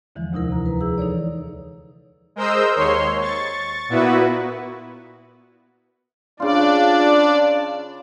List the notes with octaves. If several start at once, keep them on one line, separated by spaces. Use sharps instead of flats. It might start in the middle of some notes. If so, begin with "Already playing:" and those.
E2 D3 E3 F3 G#3
D2 C3 D#4 E4 A#4
C3 A#5
B4 A#5
E3 F3 G#4 E6
D#4 A4 C#5 D5
G#3 A#4 C5 D#5 E6 G6
D#2 C#5 C6
C#6 A6
A#2 B3 E4 F#4 B4
C#3 D4 F4 D5